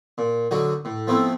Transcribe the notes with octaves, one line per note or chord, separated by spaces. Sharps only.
A#2
D3 F#3 D#4 F#4
A2
F3 A3 B3 C4 E4